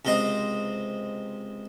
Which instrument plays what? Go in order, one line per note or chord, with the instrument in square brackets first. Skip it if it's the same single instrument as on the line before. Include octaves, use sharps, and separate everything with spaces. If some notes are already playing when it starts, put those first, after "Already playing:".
[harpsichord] C#2 C3 C4 C5 D#5